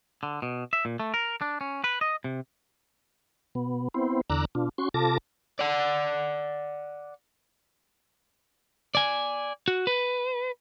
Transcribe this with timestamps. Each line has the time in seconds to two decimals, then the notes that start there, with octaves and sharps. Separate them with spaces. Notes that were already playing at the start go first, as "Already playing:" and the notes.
0.23 D3
0.42 B2
0.73 E5
0.85 A#2
1.00 A3
1.14 A#4
1.41 D4
1.61 C#4
1.84 B4
2.01 D#5
2.24 C3
3.55 B2 B3
3.94 B3 C4 E4 C5
4.30 E2 D3 A#5 D6 E6 F#6
4.55 B2 D4 F4
4.78 C#4 F#4 C6 C#6
4.94 C3 F4 A4 A5 D6 A#6
5.59 D5 F#5
8.95 D5 G#5
9.68 F#4
9.87 B4